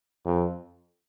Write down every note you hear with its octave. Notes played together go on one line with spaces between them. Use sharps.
F2